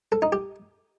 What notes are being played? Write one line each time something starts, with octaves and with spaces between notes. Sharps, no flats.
A4
D#4
G4